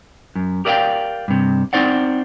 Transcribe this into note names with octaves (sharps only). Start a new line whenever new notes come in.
F#2
G4 A#4 D5 D#5 F5 G5
G2 C3
C4 D#4 C5 D5 F#5